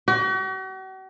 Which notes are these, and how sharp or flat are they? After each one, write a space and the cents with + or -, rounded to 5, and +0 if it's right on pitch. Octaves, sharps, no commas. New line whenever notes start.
F#4 +45